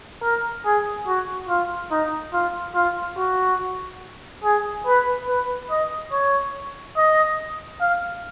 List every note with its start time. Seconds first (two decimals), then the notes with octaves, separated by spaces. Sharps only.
0.23 A#4
0.66 G#4
1.07 F#4
1.49 F4
1.91 D#4
2.33 F4
2.75 F4
3.18 F#4
4.44 G#4
4.87 B4
5.28 B4
5.71 D#5
6.12 C#5
6.97 D#5
7.80 F5